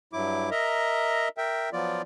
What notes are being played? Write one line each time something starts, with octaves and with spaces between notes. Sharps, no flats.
G2 F#3 E4 D6
A#4 D#5 E5 A#5
A#4 E5 G5
F3 F#3 B3 F4 D5